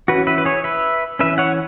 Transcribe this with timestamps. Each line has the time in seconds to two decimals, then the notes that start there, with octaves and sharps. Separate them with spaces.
0.08 E3 C#4 F#4 B4
0.27 B4 E5
0.38 B4
0.45 G#4 C#5
0.64 B4 E5
1.19 E3 C#4 B4 E5
1.38 C#5 F#5